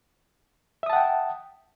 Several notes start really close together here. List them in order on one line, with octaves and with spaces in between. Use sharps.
E5 D#6 A5 F#5 G5